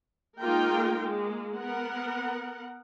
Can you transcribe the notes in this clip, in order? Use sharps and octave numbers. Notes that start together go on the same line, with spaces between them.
G#3 A#3 D#4 F4 A#4 G5
G#3 A#3
B3 A#4 F#5